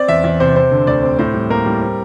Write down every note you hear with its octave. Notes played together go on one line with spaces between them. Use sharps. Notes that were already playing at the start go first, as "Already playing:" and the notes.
Already playing: C4 D5
E2 E5
E2 E5
C3 C5
C4 C5
D3
D2 D5
C4
A2 C5
G3
A#3 A#4
G3
C4